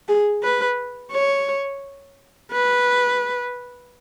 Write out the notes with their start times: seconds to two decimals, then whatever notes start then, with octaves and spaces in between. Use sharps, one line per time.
0.08 G#4
0.43 B4
1.12 C#5
2.52 B4